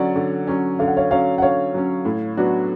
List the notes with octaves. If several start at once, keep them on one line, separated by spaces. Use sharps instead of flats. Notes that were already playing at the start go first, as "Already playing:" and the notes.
Already playing: D3 F#3 C#4 D5 F#5
D3
F#3 C#4
D3 F5
F#5
C#5 F5
F#3 C#4 C#5 F5
F#5
D3 C#5 F5
F#3 C#4
A2
F#3 B3 D4 F#4